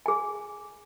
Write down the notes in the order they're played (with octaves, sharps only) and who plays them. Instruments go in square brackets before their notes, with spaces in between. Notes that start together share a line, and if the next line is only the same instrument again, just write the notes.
[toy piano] G#4 G#5